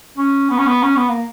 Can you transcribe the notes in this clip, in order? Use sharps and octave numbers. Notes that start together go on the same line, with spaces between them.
C#4
B3
C#4
B3
C#4
B3
A#3